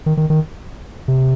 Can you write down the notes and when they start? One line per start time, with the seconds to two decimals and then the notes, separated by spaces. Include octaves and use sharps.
0.06 D#3
0.17 D#3
0.30 D#3
1.08 C3